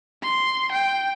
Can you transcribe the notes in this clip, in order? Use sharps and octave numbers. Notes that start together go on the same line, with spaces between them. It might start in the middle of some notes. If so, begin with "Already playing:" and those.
C6
G5